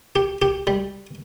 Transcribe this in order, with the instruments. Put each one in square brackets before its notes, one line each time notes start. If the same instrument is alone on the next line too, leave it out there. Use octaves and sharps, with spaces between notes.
[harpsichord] G4
G4
G3